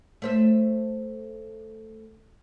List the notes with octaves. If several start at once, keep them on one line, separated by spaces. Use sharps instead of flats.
A3 C5 E5